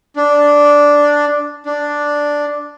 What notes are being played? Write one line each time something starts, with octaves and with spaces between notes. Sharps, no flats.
D4
D4